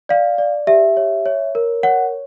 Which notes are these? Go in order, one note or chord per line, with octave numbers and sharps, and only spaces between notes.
D5 F5
D5
G4 E5
C#5
C#5
A#4
C#5 F#5